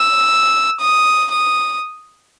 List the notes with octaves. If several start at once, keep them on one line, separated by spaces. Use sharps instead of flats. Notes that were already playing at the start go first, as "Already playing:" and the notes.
Already playing: E6
D#6
D#6